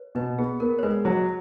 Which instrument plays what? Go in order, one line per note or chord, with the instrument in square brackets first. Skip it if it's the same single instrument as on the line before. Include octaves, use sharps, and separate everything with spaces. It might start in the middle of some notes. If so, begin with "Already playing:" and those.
Already playing: [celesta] B4 C#5
[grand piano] B2 [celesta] B4
[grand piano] B3 [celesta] G#4
[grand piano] B3 [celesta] A#4
[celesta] C#5
[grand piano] G#3 [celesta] B4
[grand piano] F#3 [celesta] C#5